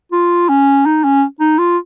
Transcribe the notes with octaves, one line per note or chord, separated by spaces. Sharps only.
F4
C#4
D#4
C#4
D#4
F4